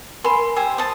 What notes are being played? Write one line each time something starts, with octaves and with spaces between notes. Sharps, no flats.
A#4 G#5 B5 C6
G4 C5 G#5 E6
A5 D#6